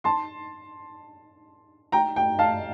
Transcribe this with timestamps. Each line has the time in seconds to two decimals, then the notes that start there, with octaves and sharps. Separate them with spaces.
0.04 A5 C6
1.92 G5 A#5
2.16 G5
2.39 F5 A5